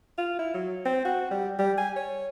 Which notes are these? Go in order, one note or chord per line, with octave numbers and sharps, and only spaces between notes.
F4
E4
F#3
C4
F#4
G3
G3
G#5
C#5